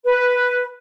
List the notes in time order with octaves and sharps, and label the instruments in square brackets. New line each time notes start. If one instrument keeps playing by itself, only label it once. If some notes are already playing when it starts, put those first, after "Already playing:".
[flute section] B4